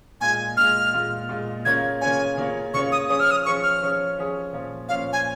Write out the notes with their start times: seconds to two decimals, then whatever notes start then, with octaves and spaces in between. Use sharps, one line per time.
0.21 A#2 G#3 F4 G#5
0.57 A#2 G#3 F4 F6
0.94 A#2 G#3 F4
1.29 A#2 G#3 F4
1.65 C#3 A#3 C#4 F4 C#5 G#6
2.01 C#3 A#3 C#4 F4 C#5 G#5
2.37 C#3 A#3 C#4 F4 C#5
2.74 C#3 A#3 C#4 F4 C#5 C#6
2.92 D#6
3.09 F3 C#4 G#4 C#5 D#6
3.20 F6
3.31 D#6
3.45 F3 C#4 G#4 C#5 C#6
3.63 F6
3.81 F3 C#4 G#4 C#5
4.18 F3 C#4 G#4 C#5
4.53 A#2 F3 C#4 F4 C#5
4.89 A#2 F3 C#4 F4 C#5 F5
5.13 G#5